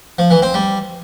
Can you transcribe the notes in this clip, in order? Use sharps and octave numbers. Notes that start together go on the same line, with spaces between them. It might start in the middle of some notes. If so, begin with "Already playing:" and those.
F3
E3
C4
G3